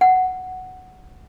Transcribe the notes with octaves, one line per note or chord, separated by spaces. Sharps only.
F#5